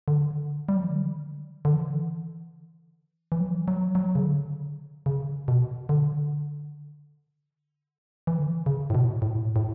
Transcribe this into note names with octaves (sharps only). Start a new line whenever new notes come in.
D3
G3
F#3
E3
D3
D3
E3
E3
F#3
F#3
F#3
C#3
D3
C#3
B2
D3
E3
D3
C#3
A2
B2
A2
A2